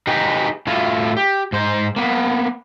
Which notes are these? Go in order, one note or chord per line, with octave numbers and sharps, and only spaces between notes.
D#4 G4 G#4 B4
A2 E4 F4
G4
G#2 C5
A#3 B3